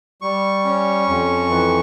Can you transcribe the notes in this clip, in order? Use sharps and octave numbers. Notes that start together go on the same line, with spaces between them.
G3 C#6
C#4
F2
E3